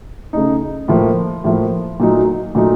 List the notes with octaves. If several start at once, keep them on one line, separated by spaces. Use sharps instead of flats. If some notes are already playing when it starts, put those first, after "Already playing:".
C#3 A3 D#4
A2 F3 A#3
A2 F3 A#3
A#2 F#3 A3 D#4
A#2 F#3 A3 D#4